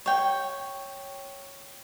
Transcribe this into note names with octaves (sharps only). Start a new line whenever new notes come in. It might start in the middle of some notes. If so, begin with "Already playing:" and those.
C#5 G5